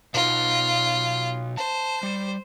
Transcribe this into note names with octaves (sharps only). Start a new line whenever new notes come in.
B2 D#4 F4
C5 A5
G3